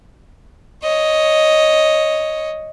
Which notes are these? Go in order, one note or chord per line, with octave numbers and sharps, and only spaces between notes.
C#5 D#5